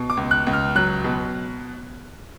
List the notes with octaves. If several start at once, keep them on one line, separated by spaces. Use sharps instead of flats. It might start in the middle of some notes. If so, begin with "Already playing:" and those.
Already playing: B2
D6
C#2
F#6
C#2
F6
F#3 F#6
B2